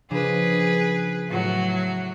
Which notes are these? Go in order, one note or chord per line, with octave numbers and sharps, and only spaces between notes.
C#3 F3 D4 G#4 B4
A2 F#3 F#4